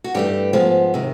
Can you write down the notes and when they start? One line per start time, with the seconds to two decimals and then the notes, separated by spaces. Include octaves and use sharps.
0.04 F#4
0.14 G2 E3 A3 G4
0.53 G#2 F3 G#3 B3
0.94 C3 D#3